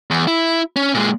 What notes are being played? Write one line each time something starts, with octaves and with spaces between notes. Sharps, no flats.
E2
E4
C#4
A#2 G#3